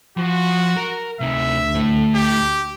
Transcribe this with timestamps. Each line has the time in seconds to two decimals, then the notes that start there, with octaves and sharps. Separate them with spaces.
0.17 F3 F#4
0.77 A#4
1.20 D2 C3 D#4 E5
1.74 A2 A3
2.15 G4